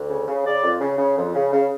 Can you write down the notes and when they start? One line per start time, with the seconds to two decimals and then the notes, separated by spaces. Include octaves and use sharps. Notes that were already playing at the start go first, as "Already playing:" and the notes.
Already playing: D2
0.10 C#3
0.28 C#3
0.45 C#3 D5
0.63 F2
0.80 C#3
0.98 C#3
1.17 F2
1.34 C#3
1.52 C#3